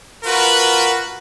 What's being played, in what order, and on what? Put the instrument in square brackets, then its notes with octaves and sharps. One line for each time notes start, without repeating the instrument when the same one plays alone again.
[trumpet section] F4 F#4 A#4 B4